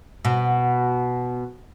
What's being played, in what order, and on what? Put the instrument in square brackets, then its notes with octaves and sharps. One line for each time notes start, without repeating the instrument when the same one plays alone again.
[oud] B2